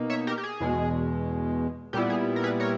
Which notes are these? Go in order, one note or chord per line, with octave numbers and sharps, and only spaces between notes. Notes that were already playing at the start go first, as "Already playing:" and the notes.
Already playing: B2 A#3 D#4
C#5 E5
G4 A#4
G4
G#4
E2 B2 G#3
A#2 G3 B3 E4 G4
G#4
A#4
G#4 B4
A#4 C#5